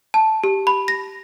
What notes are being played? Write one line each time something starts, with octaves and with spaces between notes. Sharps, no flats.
A5
G4
B5
A#6